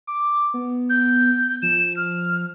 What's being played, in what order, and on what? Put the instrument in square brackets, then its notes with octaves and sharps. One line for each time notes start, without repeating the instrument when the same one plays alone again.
[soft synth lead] D6
B3
[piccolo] G6
[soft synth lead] F3 [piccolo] E7
[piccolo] F6